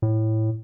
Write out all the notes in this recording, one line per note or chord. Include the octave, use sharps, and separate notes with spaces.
A2